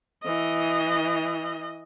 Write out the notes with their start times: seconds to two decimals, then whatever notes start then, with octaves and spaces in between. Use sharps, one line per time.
0.23 E3 D#5